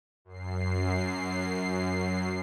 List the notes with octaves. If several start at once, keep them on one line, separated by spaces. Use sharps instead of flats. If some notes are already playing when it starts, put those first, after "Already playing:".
F#2 C7